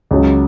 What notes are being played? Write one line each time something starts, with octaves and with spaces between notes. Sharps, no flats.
C#2 C#3 F#3